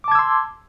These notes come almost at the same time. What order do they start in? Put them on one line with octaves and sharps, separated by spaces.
D6 A5 G#6 E6 C6